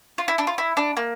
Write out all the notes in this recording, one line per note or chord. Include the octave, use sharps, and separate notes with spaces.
F4
E4
D4
F4
E4
D4
A#3